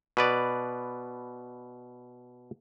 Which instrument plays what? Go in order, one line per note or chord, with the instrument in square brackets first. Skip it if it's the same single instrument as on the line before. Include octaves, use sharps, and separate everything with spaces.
[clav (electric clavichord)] B2 B4 D5